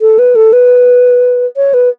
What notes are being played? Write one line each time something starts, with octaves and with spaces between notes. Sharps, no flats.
A4
B4
A4
B4
C#5
B4